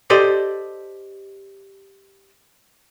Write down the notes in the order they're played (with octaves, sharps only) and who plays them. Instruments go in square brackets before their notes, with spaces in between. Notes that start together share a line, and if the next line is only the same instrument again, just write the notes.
[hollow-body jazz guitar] G4 A4 C5 D5 D#5